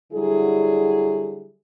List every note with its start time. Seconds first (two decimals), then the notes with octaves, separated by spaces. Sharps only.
0.12 D3 F#3 G3 E4 G#4